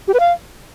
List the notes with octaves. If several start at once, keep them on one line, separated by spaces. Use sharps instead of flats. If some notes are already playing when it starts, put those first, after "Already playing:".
G4
B4
F5